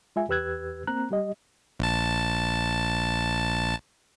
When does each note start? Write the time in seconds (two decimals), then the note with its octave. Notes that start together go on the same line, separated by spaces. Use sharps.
0.16 G#3 F4 E5 G#5
0.29 E2 G4 B4 E6 F#6 G#6
0.87 A#3 C4 A#5 F#6
1.11 G3 G4 D#5
1.80 A#1 A5